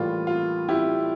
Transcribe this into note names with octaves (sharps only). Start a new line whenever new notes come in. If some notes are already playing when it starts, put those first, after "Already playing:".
Already playing: A2 E3 G3 A#3 F4
F4
E4 G4